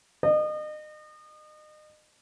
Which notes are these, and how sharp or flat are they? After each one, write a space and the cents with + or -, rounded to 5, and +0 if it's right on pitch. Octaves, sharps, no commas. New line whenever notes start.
D#5 -35